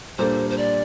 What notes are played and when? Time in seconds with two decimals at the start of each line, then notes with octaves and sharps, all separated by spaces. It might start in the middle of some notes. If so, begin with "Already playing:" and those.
0.18 A#2 G3 A#3 D4 A4 C5
0.50 C5
0.58 D5